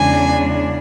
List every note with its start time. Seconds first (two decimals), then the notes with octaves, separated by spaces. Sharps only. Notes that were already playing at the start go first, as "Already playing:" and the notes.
Already playing: E2 C#3 G#3 D4 G#5